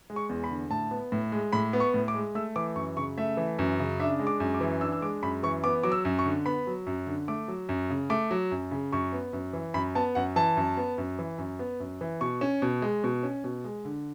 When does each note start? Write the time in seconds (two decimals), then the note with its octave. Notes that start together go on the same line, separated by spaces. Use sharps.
0.10 G#3
0.16 C#6
0.29 E2
0.44 B5
0.50 D3
0.70 A2 A5
0.91 B3
1.12 A2
1.32 G#3
1.53 A2 B5
1.73 B3
1.80 C#6
1.94 A2
2.08 D6
2.14 G#3
2.35 A3 E6
2.56 E3 D6
2.76 F#2 C#6
2.97 C#3 C#6
3.18 A3 E5
3.37 E3
3.59 F#2
3.79 C#3
4.00 D4 E5
4.19 G#3
4.27 D6
4.40 F#2
4.54 D6
4.61 E3
4.81 D4 E6
4.92 E6
5.02 G#3 D6
5.23 F#2 B5
5.43 E3 C#6
5.64 B3 D6
5.83 F#3 D6
5.92 E6
6.05 F#2
6.19 C#6
6.26 D3
6.45 B3 B5
6.67 F#3
6.87 F#2
7.07 D3
7.28 A3 D6
7.48 F#3
7.69 F#2
7.90 C#3
8.10 A3 D6
8.31 F#3
8.51 F#2
8.71 C#3
8.92 F#2 C#6
9.13 B3
9.33 F#2
9.53 E3
9.74 F#2 B5
9.95 B3 A5
10.15 F#2 F#5
10.36 E3 A5
10.57 F#2
10.77 B3
10.98 F#2
11.19 E3
11.38 F#2
11.59 B3
11.80 F#2
12.01 E3
12.21 B2 C#6
12.41 C#4
12.62 B2
12.82 G#3
13.04 B2
13.23 C#4
13.44 B2
13.65 G#3
13.85 D3